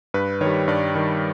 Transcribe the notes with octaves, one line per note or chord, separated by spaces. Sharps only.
G2 B4
D#3 C#5
G3
G2 D5
D#3 G3